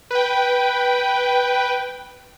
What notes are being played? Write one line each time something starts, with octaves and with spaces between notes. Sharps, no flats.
B4 G5